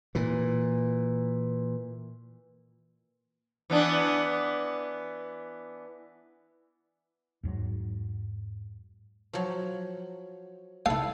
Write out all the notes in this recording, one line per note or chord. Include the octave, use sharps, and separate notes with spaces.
A#2 E3
E3 B3 D4
E2 G#2 F#3
F3 F#3
E4 A4 F5